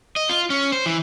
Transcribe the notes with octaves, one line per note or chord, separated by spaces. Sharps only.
D#5
F4
C#4
C5
E3